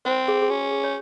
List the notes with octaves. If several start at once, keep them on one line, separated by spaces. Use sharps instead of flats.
C4 C5
G#4
G#4
C#4 F#4
G#4
C#5